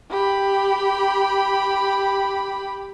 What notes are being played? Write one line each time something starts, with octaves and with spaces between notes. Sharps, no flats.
G4 B5